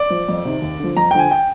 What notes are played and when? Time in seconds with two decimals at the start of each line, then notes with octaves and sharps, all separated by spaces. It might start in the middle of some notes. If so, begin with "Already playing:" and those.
Already playing: D5
0.10 F3
0.28 F2
0.45 C3 D#3
0.62 D#2
0.80 D3 F3
0.97 F2 A#5
1.11 G5
1.14 D3 F3 G#5
1.31 G5